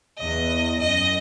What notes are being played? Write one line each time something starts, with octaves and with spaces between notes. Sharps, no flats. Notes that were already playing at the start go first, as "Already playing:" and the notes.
E2 D#5
F#2 D#5